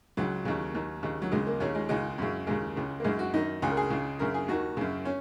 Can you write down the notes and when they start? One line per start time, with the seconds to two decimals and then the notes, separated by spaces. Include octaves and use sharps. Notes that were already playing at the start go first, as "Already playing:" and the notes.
0.17 C#2 C#3 F#3
0.45 D#2 C#3
0.74 D#2 D#3
1.03 D#2 C#3
1.22 F#3
1.32 C#2 C#3 G#3
1.47 A#3
1.60 D#2 C#3 C#4
1.75 G#3
1.89 C#2 C#3 G#3
2.18 F#2 C#3
2.47 D#2 C#3 G#3
2.76 C#2 C#3
3.00 A#3
3.04 F#2 C#3 G#3
3.19 F#4
3.33 F#2 D#3 D#4
3.62 C#2 C#3 G#4
3.70 A#4
3.77 G#4
3.90 C#2 C#3
4.19 F#2 C#3 A#4
4.34 G#4
4.48 D#2 D#3 F#4
4.77 F#2 C#3
5.05 C#4